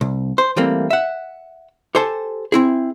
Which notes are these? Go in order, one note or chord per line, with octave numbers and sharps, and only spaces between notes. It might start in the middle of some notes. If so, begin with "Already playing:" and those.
C2
C5
E3 G3 A3 A#3 C4
E5 F#5
G4 A4 C5 G#5 A5
C4 E4 G#4